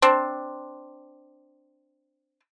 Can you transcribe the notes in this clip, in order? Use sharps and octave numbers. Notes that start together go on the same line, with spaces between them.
C4 D4